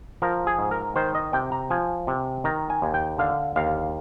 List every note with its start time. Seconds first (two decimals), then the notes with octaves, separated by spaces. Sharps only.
0.22 F3 A#4
0.47 G#4
0.59 G#2
0.71 A#4
0.96 D#3 C5
1.15 D#5
1.33 C3 G5
1.52 A#5
1.70 F3 G#5
2.07 C3
2.44 D#3 A#5
2.70 G#5
2.82 D#2
2.94 G5
3.18 D3 F5
3.56 D#2 F5